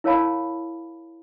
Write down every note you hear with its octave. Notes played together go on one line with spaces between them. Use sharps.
E4 A#4 C#5 F5 A5 B5